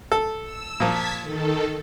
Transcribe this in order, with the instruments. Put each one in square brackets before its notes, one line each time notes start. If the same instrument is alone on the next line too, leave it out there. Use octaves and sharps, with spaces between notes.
[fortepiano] A4
[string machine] E6
[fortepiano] A#2 F3 [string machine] A5 G#6 B6
[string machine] D#3 A4